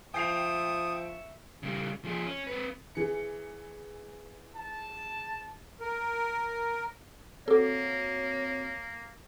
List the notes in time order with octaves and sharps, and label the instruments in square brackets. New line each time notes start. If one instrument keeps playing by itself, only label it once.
[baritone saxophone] F3 [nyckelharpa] E5 C#6 [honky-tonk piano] G5 C7 F7 [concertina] D#6
[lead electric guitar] C#3 G3
F3 G#4
C#4
C4 B4
[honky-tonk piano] E3 G#4 C#7
[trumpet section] A5
[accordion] A#4
[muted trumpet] A#3 [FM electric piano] C4 F#4 [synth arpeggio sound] A4 D6 [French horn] C#5